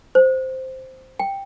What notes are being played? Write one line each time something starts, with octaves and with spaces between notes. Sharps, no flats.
C5
G5